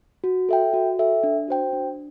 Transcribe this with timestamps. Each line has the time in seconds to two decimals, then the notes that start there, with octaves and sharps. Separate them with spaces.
0.24 F#4
0.49 A4 E5 G5
0.74 F#4
0.99 A4 E5 G5
1.23 D4
1.48 F#4 C5 G5
1.73 D4